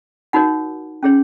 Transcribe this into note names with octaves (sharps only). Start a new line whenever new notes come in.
D#4 F#4 A#4 C#5 F#5
C#4 G#4 C#5